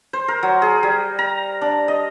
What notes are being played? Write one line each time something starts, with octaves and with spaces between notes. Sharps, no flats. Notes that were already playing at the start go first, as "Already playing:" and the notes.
C5
A#4
F#3
G#4
G3
A#5
D4
D#5